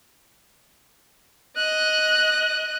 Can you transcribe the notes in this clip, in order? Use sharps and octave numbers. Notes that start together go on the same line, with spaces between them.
D#5 F#6